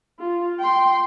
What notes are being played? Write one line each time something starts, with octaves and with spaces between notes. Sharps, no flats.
F4
G5 C6